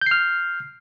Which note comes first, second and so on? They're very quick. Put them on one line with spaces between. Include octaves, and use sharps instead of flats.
G6 C7 F6